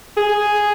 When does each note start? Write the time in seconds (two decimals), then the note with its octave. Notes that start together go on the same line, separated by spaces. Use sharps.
0.17 G#4